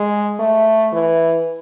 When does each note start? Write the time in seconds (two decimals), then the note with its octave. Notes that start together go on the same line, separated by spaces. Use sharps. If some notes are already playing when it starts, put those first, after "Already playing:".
Already playing: G#3
0.40 A3
0.93 E3